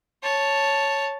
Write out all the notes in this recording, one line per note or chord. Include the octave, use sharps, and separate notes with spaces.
C#5 A5